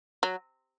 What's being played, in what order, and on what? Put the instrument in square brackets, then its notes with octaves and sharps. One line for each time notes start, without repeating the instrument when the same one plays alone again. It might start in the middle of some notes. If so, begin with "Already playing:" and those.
[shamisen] F#3